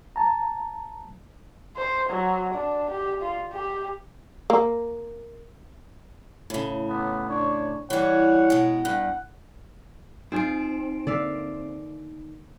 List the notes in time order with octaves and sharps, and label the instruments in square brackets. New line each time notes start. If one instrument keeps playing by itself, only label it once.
[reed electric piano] A5 A#5
[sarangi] C5
F#3
D4
G4
F4
G4
[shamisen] A#3
[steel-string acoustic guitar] A2 C#3
[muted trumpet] B3
[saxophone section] D4 [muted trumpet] C#5
[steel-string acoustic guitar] E3 G3 [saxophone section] C#5 [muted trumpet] F#5
[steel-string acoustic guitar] B2 G#3
[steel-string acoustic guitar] G2 [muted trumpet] F#5
[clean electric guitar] C4 [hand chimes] D#4 D7 [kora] F4 G#4 C5
[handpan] D3 A#3 [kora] D5 E5 F5